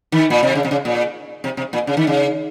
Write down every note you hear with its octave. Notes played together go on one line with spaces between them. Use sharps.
D#3
A#2
C3
C#3
C3
C#3
A#2
C3
C3
A#2
C#3
D#3
C#3